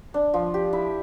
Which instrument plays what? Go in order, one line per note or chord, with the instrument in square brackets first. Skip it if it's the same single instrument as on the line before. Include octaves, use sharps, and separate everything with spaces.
[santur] D4
F3
G4
E4